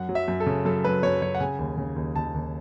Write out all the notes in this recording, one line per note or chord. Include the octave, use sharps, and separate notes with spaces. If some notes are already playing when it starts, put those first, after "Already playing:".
Already playing: F#2 F#5
F#3
E5
F#2
A4
C#3
F#2 A4
F#3 B4
F#2 C#5
F#2 C#5
F#5
C#3 G#5
D#2
C#3
D#2
D#2 A5
D#2